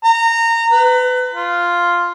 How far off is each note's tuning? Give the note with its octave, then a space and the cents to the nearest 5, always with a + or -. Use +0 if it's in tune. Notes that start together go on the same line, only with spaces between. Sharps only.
A#5 -20
B4 +25
F4 +0